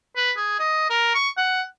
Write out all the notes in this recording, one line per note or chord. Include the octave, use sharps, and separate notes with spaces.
B4
G#4
D#5
A#4
C#6
F#5